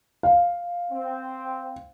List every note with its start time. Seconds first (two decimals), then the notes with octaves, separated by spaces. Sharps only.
0.23 F5
0.91 C4